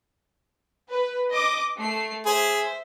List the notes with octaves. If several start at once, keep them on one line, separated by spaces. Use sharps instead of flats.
B4
D#5 D6 A#6
A3 C7
G#4 C5 E5